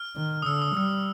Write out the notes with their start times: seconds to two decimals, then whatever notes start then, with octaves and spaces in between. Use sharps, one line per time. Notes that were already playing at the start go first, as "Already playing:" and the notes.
Already playing: F6
0.16 D#3
0.42 D#6
0.46 D3 E6
0.62 D#6
0.76 G3 E6